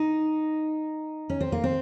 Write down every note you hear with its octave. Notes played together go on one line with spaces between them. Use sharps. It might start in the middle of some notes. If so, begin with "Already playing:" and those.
Already playing: D#4
C#4
C4
A#3
C4